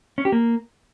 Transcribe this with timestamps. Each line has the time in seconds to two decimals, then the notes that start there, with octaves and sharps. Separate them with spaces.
0.18 C#4
0.25 G4
0.32 A#3